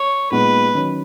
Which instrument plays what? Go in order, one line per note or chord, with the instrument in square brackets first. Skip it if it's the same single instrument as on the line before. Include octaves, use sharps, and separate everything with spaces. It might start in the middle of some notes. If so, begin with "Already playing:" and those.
Already playing: [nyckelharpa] C#5
[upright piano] A#2 G#3 B3 D#4 [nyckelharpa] B4
[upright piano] D#3 F#3 C#4